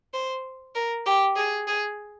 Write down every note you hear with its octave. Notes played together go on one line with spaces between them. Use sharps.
C5
A#4
G4
G#4
G#4